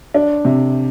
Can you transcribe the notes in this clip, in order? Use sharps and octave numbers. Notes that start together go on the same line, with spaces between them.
D4
C3